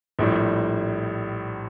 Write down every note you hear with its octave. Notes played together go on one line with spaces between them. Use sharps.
A#1 A2 G3